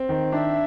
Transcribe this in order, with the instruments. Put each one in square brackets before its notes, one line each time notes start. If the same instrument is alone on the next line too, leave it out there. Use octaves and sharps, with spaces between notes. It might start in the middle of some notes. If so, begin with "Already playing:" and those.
Already playing: [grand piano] C4
D#3
[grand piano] D4 [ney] E5